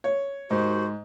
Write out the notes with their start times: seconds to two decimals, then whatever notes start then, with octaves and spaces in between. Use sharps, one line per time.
0.04 C#5
0.50 D#2 G#2 F#4 C5